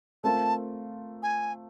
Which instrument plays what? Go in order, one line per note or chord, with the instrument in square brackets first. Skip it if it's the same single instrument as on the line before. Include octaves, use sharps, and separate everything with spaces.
[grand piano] A3 C4 F4 A#4 [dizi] A5
[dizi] G#5